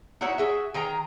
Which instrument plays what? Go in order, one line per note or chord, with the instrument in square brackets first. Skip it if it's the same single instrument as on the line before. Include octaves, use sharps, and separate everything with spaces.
[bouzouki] D#4 E4 F#4 C#5
F#4 G#4 E5
D#3 G#4 G5 A#5